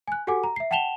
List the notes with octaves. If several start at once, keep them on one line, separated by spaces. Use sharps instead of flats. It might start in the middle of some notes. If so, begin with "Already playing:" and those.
G#5 F#6
F#4 G4 A4 F#5 G#5 D6
A#5
E5 C7
F#5 G5 A5 E7 F7 G7